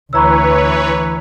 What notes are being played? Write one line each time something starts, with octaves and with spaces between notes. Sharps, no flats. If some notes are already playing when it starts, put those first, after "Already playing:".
D2 E3 B4 C#5 A#5 E6